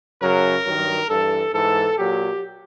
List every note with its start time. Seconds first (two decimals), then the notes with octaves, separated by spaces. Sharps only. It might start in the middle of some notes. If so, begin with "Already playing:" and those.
0.21 F#2 C#3 F#3 A#4
0.65 G2 D#3 F#3
1.08 G2 E3 A4
1.52 G#2 E3 A4
1.97 A#2 F#3 G4